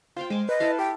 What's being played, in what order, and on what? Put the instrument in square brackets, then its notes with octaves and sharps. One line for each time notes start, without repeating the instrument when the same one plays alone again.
[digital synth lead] F4 [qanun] C5 F5 G5
[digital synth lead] G#3 [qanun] C5 G#5 D6
[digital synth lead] B4 [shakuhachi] D#5
[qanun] E4 A4 F5
[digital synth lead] G4 [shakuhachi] G5